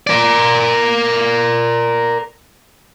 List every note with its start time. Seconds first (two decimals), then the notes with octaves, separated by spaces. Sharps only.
0.07 A#4 D5